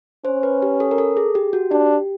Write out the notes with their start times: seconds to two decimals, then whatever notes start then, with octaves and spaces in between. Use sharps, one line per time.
0.25 C#4 C5
0.43 B4
0.62 G4
0.80 A4
0.91 A#4
0.98 A4
1.17 G#4
1.35 G4
1.53 F#4
1.71 D4 G4